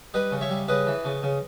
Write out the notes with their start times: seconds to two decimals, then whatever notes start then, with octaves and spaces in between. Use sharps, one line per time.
0.14 G3 B4 D#5
0.32 C#3
0.41 C#5 E5
0.50 G3
0.68 C#3 B4 D#5
0.87 E3
1.05 C#3
1.23 C#3